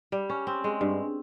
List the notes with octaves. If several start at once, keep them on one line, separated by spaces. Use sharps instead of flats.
G3
C#4
C4
G#3
G2